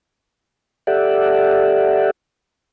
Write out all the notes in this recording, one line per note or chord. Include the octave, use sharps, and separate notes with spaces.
G4 A4 D5 E5 F#5